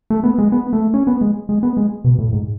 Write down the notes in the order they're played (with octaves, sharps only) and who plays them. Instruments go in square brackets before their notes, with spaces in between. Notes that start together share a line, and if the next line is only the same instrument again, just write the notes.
[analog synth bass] A3
B3
G#3
B3
A3
C#4
B3
G#3
G#3
B3
G#3
B2
A2
G#2